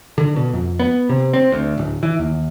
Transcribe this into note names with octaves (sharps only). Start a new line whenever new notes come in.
D3
B2
F2
B3
C3
C4
D2
D1
E3
D#2